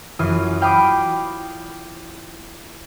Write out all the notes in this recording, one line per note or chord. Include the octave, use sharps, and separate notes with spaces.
F#2 E3 F4 D#6
F5 G5 B5 D6 D#6